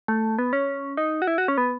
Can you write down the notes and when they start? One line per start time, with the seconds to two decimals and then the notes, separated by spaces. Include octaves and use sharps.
0.08 A3
0.38 B3
0.53 C#4
0.97 D#4
1.22 F#4
1.27 E4
1.38 F#4
1.48 C#4
1.58 B3